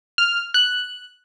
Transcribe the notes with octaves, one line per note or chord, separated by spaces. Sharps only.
F6
F#6